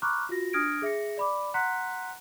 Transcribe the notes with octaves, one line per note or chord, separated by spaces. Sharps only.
A#5 B5 C#6 D6 F6 F#6
F4 F#4 A#6
D4 D#6 F6 G#6 A#6 D7
G#4 E5 A#6 C#7
D5 B5 D6
F#5 A#5 C6 F#6 B6 C#7